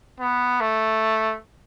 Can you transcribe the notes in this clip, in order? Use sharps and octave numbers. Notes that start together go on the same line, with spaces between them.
B3
A3